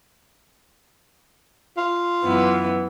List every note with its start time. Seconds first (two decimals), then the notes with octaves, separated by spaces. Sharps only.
1.77 F4
2.24 F#2 E3 B3